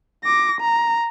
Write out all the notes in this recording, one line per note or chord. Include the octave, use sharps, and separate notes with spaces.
D6 A#6
A#5